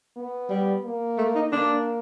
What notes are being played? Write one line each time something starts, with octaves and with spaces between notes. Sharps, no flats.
B3
G3
A#3
A3
D#4
A#3 D4